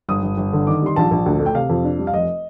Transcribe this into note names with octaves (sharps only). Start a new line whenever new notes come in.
G1 D#6
G1
G1
D3
D#3 D6
G3 C6
A#1 A5
A#1
D2
A3
G5
C3 F5
F2
D4
G3
F5
F1 D#5